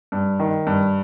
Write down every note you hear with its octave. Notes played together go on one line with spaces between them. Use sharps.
G2
D#3
G2